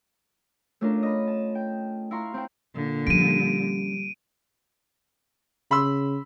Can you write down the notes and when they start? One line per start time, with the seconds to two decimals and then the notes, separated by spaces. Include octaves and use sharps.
0.81 A3 C#4 D4 F4 A#4
1.03 D#5 B5
1.27 A5
1.55 G5
2.11 E4 F5 A#5 C6 C#6
2.34 C4 E4 G5
2.75 A#2 D3
3.07 F3 G3 C#4 D7 D#7
5.71 C#3 B5 C6 E6